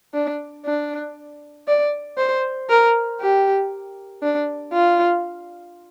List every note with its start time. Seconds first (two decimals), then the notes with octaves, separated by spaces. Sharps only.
0.14 D4
0.66 D4
1.67 D5
2.17 C5
2.70 A#4
3.21 G4
4.22 D4
4.73 F4